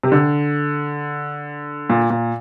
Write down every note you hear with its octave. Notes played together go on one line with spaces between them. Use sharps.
C3
D3
A#2
A#2